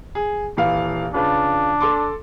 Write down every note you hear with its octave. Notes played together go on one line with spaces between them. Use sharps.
G#4
D#1 E3 F5
C#3 D4 F4 B4
A4 C6 D6